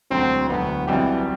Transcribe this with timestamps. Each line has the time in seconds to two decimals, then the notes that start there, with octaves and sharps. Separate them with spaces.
0.10 E1 D2 D3 F#3 C4
0.49 E1 D2 D3 F#3 B3
0.87 B1 B2 E3 G3 C4 G4